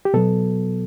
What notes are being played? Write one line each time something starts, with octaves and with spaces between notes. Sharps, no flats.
G4
B2 F#3 B3 A4